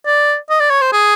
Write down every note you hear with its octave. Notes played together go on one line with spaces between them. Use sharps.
D5
D#5
D5
C#5
C5
G#4